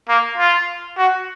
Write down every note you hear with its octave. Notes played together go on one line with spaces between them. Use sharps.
A#3
F4
F#4